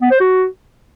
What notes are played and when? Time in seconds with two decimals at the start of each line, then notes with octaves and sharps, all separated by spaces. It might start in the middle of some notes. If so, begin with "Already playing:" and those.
0.02 B3
0.11 C5
0.20 F#4